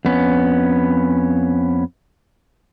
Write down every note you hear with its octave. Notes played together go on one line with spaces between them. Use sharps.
F2 B3 C#4